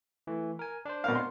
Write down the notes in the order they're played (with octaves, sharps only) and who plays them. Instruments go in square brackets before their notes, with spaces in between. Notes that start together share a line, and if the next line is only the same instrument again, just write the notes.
[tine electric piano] E3 A3
A#4 G#5
D4 C5
[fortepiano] B2 A#4 F5
C6